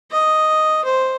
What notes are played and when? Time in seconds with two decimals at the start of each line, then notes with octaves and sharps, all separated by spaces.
0.11 D#5
0.84 C5